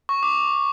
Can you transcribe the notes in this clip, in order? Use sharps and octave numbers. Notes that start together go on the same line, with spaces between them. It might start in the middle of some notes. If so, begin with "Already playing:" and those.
C#6
D6